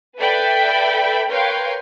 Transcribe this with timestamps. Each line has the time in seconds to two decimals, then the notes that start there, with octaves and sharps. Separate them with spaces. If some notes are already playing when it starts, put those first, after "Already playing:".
0.17 A4 B4 D5 E5 G5 B5
1.28 A#4 B4 C#5 F5 G5 C6